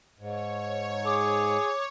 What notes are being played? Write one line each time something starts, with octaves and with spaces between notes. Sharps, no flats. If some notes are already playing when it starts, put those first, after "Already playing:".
G#2 C#5
G#4 D6